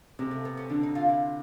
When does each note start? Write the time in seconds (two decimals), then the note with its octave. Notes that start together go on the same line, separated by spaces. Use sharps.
0.19 C3 G#3
0.31 A3
0.45 B3
0.57 C#4
0.70 D3 D4
0.83 D#4
0.95 F4
1.09 E4